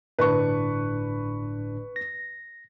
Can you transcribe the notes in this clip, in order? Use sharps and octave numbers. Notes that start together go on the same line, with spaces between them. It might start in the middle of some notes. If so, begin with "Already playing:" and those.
G1 A2 D4 B4 C#6
A#6